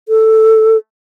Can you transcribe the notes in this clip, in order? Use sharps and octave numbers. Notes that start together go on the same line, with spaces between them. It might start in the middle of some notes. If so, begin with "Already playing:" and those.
A4